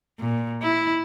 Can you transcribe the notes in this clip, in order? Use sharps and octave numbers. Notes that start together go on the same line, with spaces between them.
A#2
E4